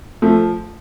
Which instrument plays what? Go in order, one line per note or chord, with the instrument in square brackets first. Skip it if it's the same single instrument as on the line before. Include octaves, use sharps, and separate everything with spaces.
[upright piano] F3 [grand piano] A3